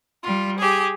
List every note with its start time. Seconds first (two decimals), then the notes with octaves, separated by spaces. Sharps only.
0.22 G3 F4
0.57 G4 G#4